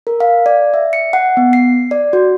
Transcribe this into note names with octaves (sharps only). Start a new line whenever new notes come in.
A#4
F5
D5
E5
C#7
F#5
B3
C7
D5
F#4